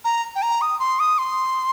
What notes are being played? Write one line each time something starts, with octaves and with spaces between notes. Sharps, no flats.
A#5
G5
A#5
D#6
C6
D#6
C6